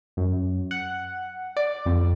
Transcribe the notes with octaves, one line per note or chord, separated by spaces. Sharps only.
F#2
F#5
D5
F2